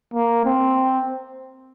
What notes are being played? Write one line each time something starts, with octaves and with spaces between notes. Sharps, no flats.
A#3
C4